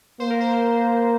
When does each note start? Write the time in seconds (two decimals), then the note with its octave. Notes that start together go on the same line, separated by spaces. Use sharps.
0.20 A#3 C5
0.30 A#4
0.40 C5